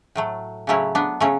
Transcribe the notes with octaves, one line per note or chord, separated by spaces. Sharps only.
A2 F#3 A3
C#3 F#3 A3 C#4 E4
B3 D4
C#3 F#3 A3 C#4